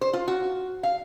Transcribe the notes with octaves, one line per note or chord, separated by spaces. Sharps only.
C5
F4
F#4
F5